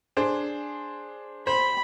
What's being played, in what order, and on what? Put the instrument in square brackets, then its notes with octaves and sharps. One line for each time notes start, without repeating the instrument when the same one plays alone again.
[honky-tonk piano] D4 G#4 C5
[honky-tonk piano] C5 [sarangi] B5